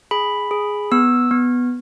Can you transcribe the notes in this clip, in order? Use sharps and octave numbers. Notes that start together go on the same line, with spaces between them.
G#4 B5
G#4
B3 E6
B3